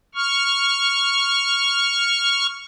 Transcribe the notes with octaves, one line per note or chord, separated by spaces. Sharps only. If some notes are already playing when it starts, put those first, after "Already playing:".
C#6 F6